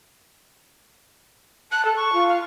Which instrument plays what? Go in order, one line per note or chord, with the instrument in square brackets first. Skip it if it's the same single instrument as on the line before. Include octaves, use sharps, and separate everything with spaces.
[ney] A5 [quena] F#6
[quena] A4
C#6
[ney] F4
[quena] F5